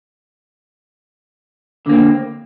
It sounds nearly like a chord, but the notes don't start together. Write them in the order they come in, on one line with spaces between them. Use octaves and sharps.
D3 A#3 C4